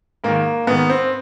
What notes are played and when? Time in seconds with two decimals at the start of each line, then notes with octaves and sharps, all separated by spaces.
0.24 G#2 D#3 A#3
0.67 G#2 D#3 B3
0.90 C4